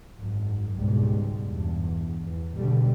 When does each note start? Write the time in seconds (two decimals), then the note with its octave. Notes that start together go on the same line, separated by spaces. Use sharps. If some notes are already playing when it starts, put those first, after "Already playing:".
0.18 G#1 F#2
0.77 C#2 G#2 B2 G3
1.44 E2 G2
2.22 E2
2.57 B2 D3 G3